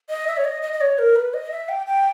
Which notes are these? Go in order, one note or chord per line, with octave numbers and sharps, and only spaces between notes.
D#5
E5
C#5
D#5
D#5
D#5
C#5
A#4
B4
D#5
E5
G5
G5